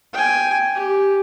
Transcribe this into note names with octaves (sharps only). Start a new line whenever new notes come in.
G5 G#5
G4